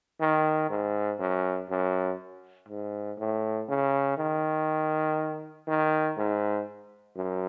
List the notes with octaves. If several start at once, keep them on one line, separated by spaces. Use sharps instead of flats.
D#3
G#2
F#2
F#2
G#2
A2
C#3
D#3
D#3
G#2
F#2